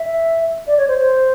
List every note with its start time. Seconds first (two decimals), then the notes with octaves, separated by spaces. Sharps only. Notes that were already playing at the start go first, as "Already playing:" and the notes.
Already playing: E5
0.67 D5
0.78 C#5
0.88 C5
0.98 C5